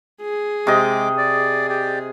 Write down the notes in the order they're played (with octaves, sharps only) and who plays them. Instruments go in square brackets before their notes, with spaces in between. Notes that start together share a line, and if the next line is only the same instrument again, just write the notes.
[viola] G#4
[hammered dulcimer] C3 D#5 [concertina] G#3 D6
[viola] G#4 [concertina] D5
[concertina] G4 D5